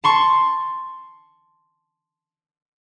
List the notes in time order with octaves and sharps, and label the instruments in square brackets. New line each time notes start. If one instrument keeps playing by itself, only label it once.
[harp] A5 C6 C#6